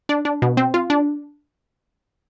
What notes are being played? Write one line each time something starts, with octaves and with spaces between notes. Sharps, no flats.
D4
D4
B2
C4
F4
D4